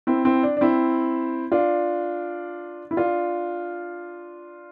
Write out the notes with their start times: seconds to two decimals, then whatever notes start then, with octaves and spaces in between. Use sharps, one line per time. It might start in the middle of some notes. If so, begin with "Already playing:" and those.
0.07 C4 E4
0.25 C4 E4
0.43 D4
0.57 D4
0.61 C4 E4
1.52 D4 F4
2.91 E4
2.97 D4 F4